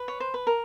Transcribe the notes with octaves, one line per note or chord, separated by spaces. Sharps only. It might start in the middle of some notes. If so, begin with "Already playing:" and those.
Already playing: B4
C#5
C5
B4
A#4